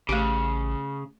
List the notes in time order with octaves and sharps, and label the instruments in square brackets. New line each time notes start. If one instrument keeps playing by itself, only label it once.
[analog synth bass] A1 [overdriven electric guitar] C#3 [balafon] A3 G4